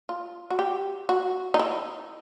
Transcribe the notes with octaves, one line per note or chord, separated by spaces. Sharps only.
F4
F#4
G4
F#4
D#4
E4